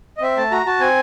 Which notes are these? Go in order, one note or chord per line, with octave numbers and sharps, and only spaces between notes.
D#5
C4 E5
A3 A5
F#4 A#5
F#4 A5
C4 G#5